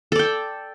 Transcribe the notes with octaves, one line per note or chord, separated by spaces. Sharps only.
A4 D5 G5